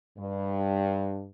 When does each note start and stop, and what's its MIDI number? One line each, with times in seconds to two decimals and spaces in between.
0.18 1.26 43